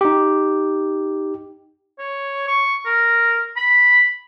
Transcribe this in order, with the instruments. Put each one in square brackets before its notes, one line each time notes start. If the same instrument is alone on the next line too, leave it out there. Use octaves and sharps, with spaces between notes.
[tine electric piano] D#4 G4
[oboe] C#5
C#6
A#4
B5